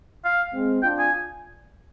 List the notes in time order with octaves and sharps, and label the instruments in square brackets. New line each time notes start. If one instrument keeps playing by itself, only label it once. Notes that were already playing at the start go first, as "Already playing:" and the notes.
[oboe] F5
[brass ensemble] G#3 C4
[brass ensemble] D4 F4 [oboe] G5
[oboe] G#5